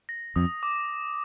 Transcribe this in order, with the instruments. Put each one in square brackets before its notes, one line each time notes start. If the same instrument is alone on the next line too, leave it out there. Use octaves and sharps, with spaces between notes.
[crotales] A#6
[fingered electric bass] F2 [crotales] D#6
[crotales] D6